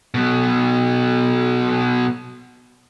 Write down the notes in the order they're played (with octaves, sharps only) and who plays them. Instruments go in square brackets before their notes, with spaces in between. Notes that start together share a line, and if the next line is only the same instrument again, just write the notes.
[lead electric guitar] B2 F#3